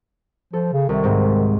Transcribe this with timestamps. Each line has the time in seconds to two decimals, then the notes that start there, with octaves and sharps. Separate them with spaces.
0.53 F3 A4
0.73 C#3
0.89 C2 D#3
1.04 G#2 C4